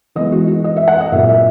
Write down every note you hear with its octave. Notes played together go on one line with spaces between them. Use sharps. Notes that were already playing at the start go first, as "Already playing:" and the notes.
E3 G#3 B3 D#5
F#4
F#4
D#5
E5
F#5
D#5
A#2 F#3 A#3 E5
E5